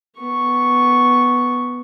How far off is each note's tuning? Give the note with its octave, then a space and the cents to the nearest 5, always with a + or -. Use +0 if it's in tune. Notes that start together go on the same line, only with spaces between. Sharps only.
B3 +0 C#6 +0